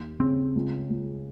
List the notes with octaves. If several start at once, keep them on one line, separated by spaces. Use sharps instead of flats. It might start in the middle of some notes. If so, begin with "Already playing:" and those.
Already playing: D#2
C#3 C4
C#2
C#2